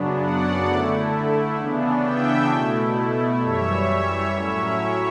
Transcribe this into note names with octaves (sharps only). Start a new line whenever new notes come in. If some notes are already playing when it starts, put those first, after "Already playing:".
Already playing: F#2 C#3 F#3 B3 D4
D5 F#5
D3 A3 E4
C#3 E3 B3 D4
E5 G5
B2 A3 E4
F#2 E3 G3 C#5 E5
A2 F#3 C#4 E4 C#5 E5